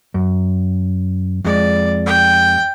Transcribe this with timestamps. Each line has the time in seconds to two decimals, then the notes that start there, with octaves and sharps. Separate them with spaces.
0.14 F#2
1.45 F2 G#3 D5
2.06 G5